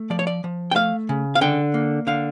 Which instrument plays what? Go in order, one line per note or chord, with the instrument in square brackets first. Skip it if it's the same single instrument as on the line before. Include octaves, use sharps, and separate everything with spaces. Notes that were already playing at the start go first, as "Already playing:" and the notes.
Already playing: [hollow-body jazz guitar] A3
F3 D5
C#5
D5
F3
G5
A3 F5
C#3
F5
D3 G5
A#3
D3 F5